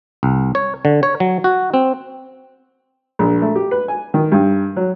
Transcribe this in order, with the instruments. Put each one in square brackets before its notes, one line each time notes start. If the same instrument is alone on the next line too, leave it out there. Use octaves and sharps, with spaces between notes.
[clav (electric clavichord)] C2
C#5
D3
C#5
F#3
F#4
C4
[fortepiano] A#1
A3
G4
B4
G#5
D#3
G2
F#3